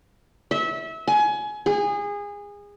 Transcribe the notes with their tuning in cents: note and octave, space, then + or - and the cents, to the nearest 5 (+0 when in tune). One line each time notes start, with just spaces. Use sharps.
E5 -25
G#5 +25
G#4 -25